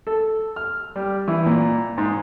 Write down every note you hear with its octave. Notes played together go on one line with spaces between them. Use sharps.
A4
F6
G3
E3
A#2
G#2